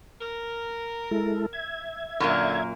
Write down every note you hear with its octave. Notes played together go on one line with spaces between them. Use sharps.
A#4
G#3 E4 A4
E5 G#6
F#2 A#2 D3 A#3